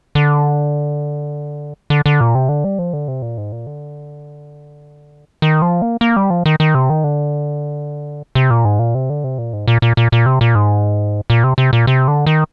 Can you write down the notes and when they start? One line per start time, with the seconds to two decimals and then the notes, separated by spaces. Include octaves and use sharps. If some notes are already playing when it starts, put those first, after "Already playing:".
0.15 D3
1.90 D3
2.06 D3
2.21 A#2
2.35 C3
2.49 D3
2.64 G3
2.79 F3
2.93 D3
3.08 C3
3.22 A#2
3.38 G#2
3.52 A#2
3.67 D3
5.42 D#3
5.62 F3
5.82 A#3
6.01 A#3
6.17 G3
6.30 F3
6.46 D#3
6.60 D#3
6.75 C3
6.90 D#3
7.04 D3
8.35 C3
8.51 A#2
8.65 G#2
8.79 A#2
8.95 C3
9.10 D3
9.24 C3
9.38 A#2
9.53 G#2
9.68 A#2
9.82 A#2
9.97 A#2
10.12 A#2
10.26 C3
10.41 A#2
10.55 G#2
11.30 A#2
11.44 C3
11.58 C3
11.73 A#2
11.87 C3
12.08 D3
12.26 D#3